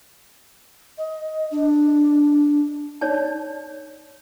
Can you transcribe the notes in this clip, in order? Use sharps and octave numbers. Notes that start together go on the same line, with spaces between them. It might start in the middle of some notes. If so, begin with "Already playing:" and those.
D#5
D4
D#4 C#5 D5 A5